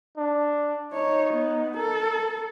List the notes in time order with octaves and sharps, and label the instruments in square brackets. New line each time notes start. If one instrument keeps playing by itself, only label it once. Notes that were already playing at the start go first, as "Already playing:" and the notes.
[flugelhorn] D4
[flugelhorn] D#4 [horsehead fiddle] C#5
[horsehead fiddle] B3
[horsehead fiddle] A4 [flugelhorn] A#4